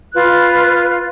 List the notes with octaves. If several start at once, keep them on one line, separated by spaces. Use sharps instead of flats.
F4 B4 F#6